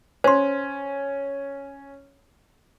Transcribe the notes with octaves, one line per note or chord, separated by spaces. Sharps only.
C#4 C5 C6